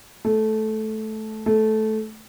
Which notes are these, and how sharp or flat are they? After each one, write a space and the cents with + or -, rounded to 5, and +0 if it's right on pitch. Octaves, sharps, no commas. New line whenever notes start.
A3 -15
A3 -15